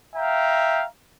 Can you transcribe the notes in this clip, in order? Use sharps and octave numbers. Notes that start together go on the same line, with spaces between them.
E5 F5 G5 A#5